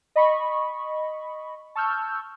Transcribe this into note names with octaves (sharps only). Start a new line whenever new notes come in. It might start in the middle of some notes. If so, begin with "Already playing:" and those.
D#5 B5 C#6
A5 C#6 E6 F6 G6